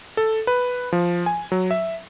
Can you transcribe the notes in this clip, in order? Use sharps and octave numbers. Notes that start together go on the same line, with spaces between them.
A4
B4
F3
G#5
F#3
E5